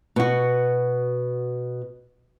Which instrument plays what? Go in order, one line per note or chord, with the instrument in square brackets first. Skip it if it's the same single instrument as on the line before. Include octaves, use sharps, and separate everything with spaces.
[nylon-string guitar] B2 F#4